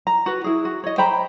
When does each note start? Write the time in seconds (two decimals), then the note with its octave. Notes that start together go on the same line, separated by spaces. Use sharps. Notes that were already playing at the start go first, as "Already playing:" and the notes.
0.07 A#5
0.26 F#4 B4
0.44 E4 G#4
0.65 F#4
0.84 C#5 D#5
0.98 C5 G5 A#5 B5